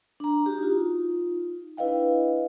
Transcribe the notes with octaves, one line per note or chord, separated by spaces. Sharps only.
D4 A#5
F#4 G4
D#4 F4
D4 E4 B4 D#5 F5 G5